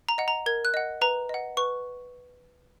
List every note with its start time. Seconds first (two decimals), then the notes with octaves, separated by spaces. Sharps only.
0.09 A#5
0.18 D#5 F#5
0.28 A#5
0.46 A#4 G#6
0.65 F#6
0.74 D#5 F#5
1.01 B4 A#5
1.29 D#5 F#5
1.57 B4 C#6